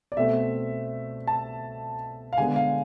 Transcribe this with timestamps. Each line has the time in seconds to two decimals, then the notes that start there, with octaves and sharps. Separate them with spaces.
0.12 D5
0.17 B2 A3 C4 E5
1.27 A5
2.33 F5
2.38 D3 G#3 B3 G#5
2.56 F5